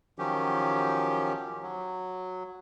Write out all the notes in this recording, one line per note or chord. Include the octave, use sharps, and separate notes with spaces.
D#3 F3 F#3 C#4 G4
F#3